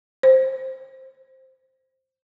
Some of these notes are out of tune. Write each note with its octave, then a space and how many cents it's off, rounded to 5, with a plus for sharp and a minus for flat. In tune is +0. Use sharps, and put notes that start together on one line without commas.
C5 +10